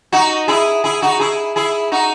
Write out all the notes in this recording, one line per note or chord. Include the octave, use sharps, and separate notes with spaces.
D#4 F#4
E4 G#4
E4 G#4
D#4 F#4
E4 G#4
E4 G#4
D#4 F#4